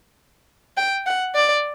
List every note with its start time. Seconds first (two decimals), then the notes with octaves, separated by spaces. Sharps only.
0.77 G5
1.06 F#5
1.35 D5